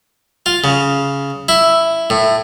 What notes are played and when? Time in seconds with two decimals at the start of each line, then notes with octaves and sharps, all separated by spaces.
0.46 F4
0.64 C#3
1.49 E4
2.10 A2